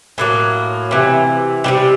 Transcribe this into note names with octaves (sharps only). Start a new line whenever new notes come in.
A2 F#3 A#3
C3 E3
C3 E3 G3